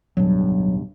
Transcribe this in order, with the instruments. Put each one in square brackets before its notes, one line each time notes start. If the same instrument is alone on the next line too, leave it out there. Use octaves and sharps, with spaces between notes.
[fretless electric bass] D1 B1 G2 [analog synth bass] F#3